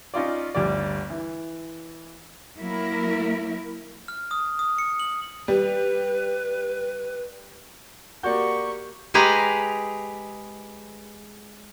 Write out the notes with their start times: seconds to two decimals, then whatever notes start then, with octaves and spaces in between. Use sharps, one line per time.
0.14 C#4 D#4 F4 D5
0.55 G1 D2 G3 D5
1.10 E3
2.59 F#3 A#3 E4 A#4
4.08 F6
4.31 D#6
4.59 D#6
4.78 C#7
5.00 F#7
5.48 G3 B4
8.23 A#3 F#4 G4 D5 C#6 G6
9.14 G#3 G4 G#4 B4 A#5